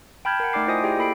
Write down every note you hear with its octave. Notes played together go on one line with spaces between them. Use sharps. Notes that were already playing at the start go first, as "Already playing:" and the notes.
G5 A5 B5 F6 G6 G#6
A#4 F#5
A3 D#4 D5 G5 D6 C7
E4 F4 C5 D#5 G#5 D#6
E4 G4 G#4 D5 G5
A#3 E4 A4 B5 C7 D7